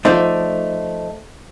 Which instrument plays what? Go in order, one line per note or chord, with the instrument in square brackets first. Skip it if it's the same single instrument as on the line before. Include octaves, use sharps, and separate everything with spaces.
[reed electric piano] F3 C5 [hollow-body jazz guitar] A3 D#4 D5